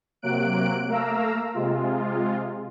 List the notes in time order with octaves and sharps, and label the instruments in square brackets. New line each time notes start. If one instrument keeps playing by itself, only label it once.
[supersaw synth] C3 F#3 A#3 F#6 D7
A3 A#3 F5 A#5 E6
C3 G#3 F4